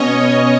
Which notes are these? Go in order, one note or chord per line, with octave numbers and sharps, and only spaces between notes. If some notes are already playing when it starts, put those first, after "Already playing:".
Already playing: B2 C#4 C#5 D#5